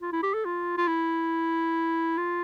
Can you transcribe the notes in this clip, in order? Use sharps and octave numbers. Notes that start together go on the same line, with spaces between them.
F4
E4
G4
A4
F4
F4
E4
F4